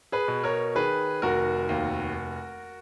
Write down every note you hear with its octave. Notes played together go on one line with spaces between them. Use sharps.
G#4 B4
B2
A#4 C#5
D#3 G#4 B4
F1 F#4 A#4
D#2